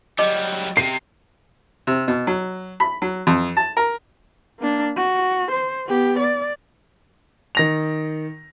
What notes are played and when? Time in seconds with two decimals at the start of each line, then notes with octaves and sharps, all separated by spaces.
0.19 F#3 G3 D#5 D6
0.77 C3 C7
1.87 C3
2.08 B2
2.27 F#3
2.80 B5
3.02 F#3
3.27 F2
3.57 A5
3.77 A#4
4.60 A#3 D4
4.97 F#4
5.52 C5
5.87 B3 G4
6.19 D5
7.55 D#3 A#6 F7